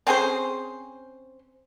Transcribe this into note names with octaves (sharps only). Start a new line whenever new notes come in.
C4 C#4 G#4 C5